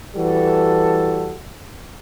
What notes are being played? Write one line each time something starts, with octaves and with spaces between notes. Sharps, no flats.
E3 G3 F#4 A4